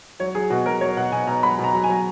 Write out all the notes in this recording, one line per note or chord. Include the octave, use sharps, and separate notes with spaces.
F#3 C#5
F#3 G#4
B2 F#4
F#3 A#4
F#3 C#5
B2 F#5
B2 G#5
B2 A#5
F#3 B5
B2
A#5
F#3
G#5
F#3